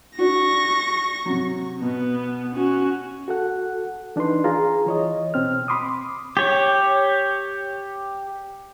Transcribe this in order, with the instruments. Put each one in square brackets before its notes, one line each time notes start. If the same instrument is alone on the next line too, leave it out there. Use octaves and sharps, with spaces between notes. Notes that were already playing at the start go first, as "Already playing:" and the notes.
[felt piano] D4 F#4 [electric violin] C#6 A#6
[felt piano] C3 F#3
[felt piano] B2 [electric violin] B3
[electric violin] C#4 F#4
[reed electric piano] F#4 A4 F#5
E3 D4 D#4 B4 C6
F4 G#4 A#5
E3 C#5 D#5
B2 C4 F6
B5 C6 D6 D#6
[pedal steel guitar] G4 C#5